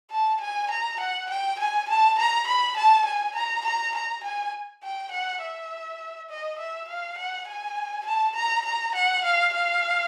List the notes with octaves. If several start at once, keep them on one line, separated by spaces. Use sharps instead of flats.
A5
G#5
A#5
F#5
G5
G#5
A5
A#5
B5
A5
G#5
A#5
A#5
A#5
G#5
G5
F#5
E5
D#5
E5
F5
F#5
G#5
A5
A#5
A#5
F#5
F5
F5